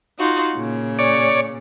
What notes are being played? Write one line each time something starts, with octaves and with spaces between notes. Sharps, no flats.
D#4 F4 F#4
A#2 C#3
C#5 D5